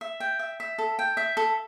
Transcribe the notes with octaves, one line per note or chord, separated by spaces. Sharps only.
E5
G5
E5
E5
A4
G5
E5
A4